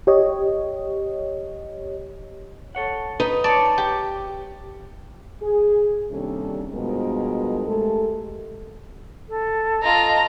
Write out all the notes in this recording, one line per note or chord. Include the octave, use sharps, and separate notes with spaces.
G4 C#5 D#5
A4 C#5 F#5
D#4 B4
C#5 D5 A5
G4
G#4
D#2 C3 G3 C#4 D4 A4
G2 B2 F3 G#3 A#4
G#3 A3 G4 A4
A4
F4 A4 D#5 A#5